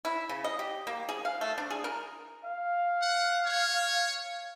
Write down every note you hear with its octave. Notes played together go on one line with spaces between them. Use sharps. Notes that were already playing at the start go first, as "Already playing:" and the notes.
E4
C#3
D#5
G4
A#3
G#4
F5
A3
D4
G#4
A#4
F5
F#5
C#5